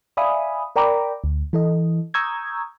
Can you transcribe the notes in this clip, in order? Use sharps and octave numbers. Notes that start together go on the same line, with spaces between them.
D5 E5 F5 G#5 B5 D#6
A#4 D5 G5 A#5 B5 D6
D2
E3 A4 D#5
A#5 C#6 D#6 E6 G6 G#6